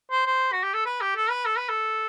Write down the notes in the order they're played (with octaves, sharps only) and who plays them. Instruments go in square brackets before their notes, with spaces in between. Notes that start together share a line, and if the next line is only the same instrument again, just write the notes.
[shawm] C5
C5
F#4
G4
A4
B4
G4
A4
B4
A4
B4
A4